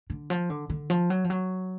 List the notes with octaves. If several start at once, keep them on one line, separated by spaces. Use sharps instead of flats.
D3
F3
D3
D3
F3
F#3
F3
F#3